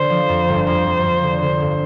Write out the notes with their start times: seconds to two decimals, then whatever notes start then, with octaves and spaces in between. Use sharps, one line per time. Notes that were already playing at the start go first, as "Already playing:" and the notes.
Already playing: D3 C5
0.10 F3
0.29 F2
0.48 G1
0.67 F2 C5
0.86 F2
1.05 F2
1.23 D3
1.41 D3 C5
1.60 G1